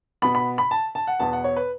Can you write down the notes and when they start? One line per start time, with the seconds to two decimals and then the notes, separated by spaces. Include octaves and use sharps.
0.22 B2 B3 B5
0.35 B5
0.58 B5
0.71 A5
0.95 A5
1.07 F#5
1.19 E2 B2 B3 A5
1.33 F#5
1.44 C#5
1.56 B4